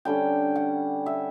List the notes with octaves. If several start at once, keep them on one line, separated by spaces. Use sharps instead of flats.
D3 G3 C#4 G5
F#5
E5